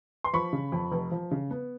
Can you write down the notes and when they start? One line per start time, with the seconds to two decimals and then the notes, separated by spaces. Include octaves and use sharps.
0.24 C6
0.33 F3 B5 C#6
0.53 C#3
0.72 F2
0.92 F1
1.11 F3
1.31 C#3
1.51 B3